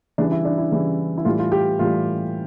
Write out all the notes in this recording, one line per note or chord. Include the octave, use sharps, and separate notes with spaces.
C#3 E3 G3 D4
E4
D4
E4
C#3 E3 G3
E4
A2 E3 G3 F4
F4
G4
A2 E3 G3 F4